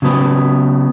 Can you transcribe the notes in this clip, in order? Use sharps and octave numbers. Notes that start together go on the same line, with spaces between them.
C#3 F#3 B3